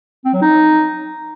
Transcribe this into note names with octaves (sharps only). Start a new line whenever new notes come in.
C4
F#3
D#4